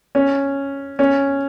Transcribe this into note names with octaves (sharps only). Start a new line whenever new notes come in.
C#4
C#4